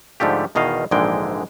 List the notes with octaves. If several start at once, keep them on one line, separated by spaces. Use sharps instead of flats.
G#2 D3 F3 A3 G4
E2 B2 D#3 D#5 F5
A#1 G#2 D3 E3 G#3 G5